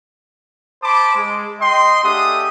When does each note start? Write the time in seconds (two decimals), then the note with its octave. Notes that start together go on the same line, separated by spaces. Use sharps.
0.83 C5 A5 B5 D6
1.15 G#3
1.61 D#5 G5 C6
2.03 A3 D4 G4 G#4 F#5 D#6